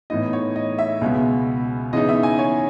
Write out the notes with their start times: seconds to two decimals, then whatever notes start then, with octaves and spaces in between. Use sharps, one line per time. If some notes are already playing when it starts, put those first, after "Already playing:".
0.10 A2 E3 B3 D#4 D#5
0.33 C#5
0.56 D#5
0.79 E5
1.01 C#2 B2 G#3 B3
1.93 C#3 E3 B3 D#4 D#5
2.09 E5
2.23 G#5
2.39 C#5